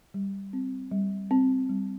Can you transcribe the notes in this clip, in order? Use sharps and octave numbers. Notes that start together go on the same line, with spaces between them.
G3
C4
G3
C4
G3